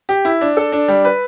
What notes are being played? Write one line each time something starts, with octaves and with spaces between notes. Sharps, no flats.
G4
E4
D4
A4
D4
G3
B4